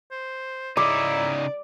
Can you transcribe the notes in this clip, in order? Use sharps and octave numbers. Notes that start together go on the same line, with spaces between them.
C5
C#3 D#4 E4 D5 D6